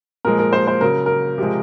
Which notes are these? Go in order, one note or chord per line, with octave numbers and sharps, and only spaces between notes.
A#2 F3 G#3 A#4
A#4
C5
C5
C#3 F#3 A#4
A#4
C3 F3 G#3